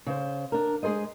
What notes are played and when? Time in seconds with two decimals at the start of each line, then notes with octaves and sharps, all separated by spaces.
0.06 C#3 C5
0.52 D4 A#4
0.83 G#3 G#4 A4 C5 D#5